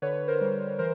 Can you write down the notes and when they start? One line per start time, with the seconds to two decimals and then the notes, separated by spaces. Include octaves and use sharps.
0.02 D3 B4 C#5
0.28 A#4 C5
0.41 G3
0.79 E3 A#4 C5